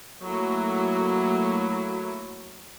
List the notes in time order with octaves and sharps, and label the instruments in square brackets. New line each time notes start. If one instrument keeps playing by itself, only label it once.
[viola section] F#3 A3 A#3 E4 F#4